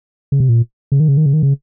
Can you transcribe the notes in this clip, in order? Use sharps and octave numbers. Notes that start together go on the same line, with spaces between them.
C#3
C3
A#2
C#3
D#3
C#3
D#3
C#3
D#3
C#3